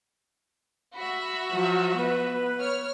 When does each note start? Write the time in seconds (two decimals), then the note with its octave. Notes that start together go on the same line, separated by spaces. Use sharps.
0.96 F#4 E5 B5
1.52 F3 F#3
1.98 B3 B4
2.59 C#5 F6